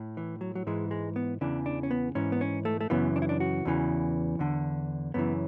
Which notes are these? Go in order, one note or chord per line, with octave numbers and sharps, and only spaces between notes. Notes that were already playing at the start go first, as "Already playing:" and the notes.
Already playing: A2
E3
F#3
F#3
G#2 E3 G#3
G#3
B3
E2 C#3 E3 D4
D4
C#4
B3
G#2 E3 C#4
B3
C#4
A3
A3
F#2 C#3 E3 B3
D4
E4
D4
F#4
E2 C#3 E3
E2 D3
F#2 C#3 E3 B3